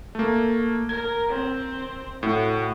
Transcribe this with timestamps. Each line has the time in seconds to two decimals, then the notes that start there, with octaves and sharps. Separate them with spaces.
0.15 A3 A#3
0.89 A#4 G#6
1.29 C4
2.23 A2 F#4